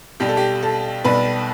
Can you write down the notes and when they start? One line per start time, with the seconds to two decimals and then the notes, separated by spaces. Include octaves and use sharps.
0.20 B1 B2 G3 G4
0.29 A4
0.37 G4
0.62 A4
1.04 B1 B2 G3 B4